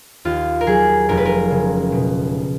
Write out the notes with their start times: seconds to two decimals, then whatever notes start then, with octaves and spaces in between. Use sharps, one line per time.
0.25 D#2 F4
0.61 A#4
0.67 F#3 G#4
1.09 F1 A#4
1.17 B4
1.25 A#4
1.50 C#3
1.92 B2